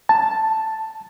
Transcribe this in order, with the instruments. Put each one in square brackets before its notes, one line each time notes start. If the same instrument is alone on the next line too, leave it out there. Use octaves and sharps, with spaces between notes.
[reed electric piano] A5